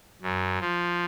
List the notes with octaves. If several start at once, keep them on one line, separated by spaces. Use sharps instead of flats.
F#2
F3